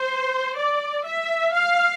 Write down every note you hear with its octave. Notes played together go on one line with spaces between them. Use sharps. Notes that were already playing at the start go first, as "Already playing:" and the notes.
Already playing: C5
D5
E5
F5